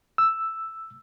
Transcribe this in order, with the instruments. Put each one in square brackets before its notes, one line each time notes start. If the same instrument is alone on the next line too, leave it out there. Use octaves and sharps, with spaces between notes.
[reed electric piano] E6